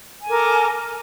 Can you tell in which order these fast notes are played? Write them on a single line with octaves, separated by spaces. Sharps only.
G#5 A4 A#4 D6